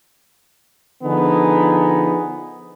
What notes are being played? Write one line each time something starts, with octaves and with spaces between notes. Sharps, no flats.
D3 F3 B3 D#4 G#4